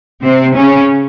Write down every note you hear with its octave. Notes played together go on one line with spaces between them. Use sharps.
C3 C4
C#3 C#4